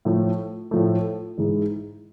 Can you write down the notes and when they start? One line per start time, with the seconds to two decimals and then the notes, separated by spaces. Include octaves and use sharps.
0.05 A2 F3 A3
0.71 A2 F3 A3
1.38 G#2 E3 G#3